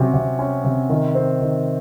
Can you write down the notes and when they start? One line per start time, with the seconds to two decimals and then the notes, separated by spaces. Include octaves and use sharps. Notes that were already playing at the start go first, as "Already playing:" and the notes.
Already playing: C3 F#3 C#4
0.14 C3
0.39 C#4
0.64 C3
0.89 D#3
1.15 C4
1.41 D#3